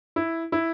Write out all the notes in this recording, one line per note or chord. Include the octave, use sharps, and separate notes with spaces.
E4
E4